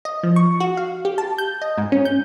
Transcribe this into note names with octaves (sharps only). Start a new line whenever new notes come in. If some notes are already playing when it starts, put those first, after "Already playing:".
D#5
F3
C#6
F#4
F5
G4
A5
G6
D#5
G#2
C#4
G6